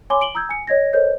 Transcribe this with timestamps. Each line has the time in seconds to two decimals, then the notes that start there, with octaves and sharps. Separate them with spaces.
0.10 C#5 G#5 B5 C6 D6 G7
0.21 D7 F#7 G7
0.35 A#5 D#6 E6 G6 G#6
0.49 G#5 C#7
0.67 C#5 D#5 G#6 A#6
0.93 A4 A#4 C5 C#5 D#5 G6